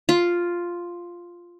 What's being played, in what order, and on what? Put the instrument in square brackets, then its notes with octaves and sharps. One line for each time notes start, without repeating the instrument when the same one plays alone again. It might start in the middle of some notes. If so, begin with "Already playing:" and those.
[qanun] F4